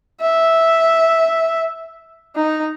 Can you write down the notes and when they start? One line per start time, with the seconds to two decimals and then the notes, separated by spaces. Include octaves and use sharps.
0.21 E5
2.35 D#4